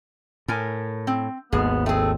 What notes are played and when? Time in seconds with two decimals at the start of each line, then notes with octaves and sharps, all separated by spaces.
0.48 A2 A#4 G#5
1.07 C4
1.52 G#1 D#2 B3 G#4
1.86 A3 C4 G#4